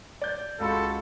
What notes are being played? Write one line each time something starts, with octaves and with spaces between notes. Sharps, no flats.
D5 G6
C#2 F#4 A4 F5 B5 C6 C#7